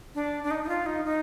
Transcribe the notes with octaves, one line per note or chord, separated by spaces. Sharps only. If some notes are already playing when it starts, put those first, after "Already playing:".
D4
D4
D#4
D#4
F4
D#4
D#4